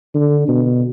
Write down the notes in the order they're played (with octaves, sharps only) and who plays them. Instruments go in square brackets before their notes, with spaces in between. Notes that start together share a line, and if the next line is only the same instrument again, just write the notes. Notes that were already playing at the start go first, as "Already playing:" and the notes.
[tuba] D3
B2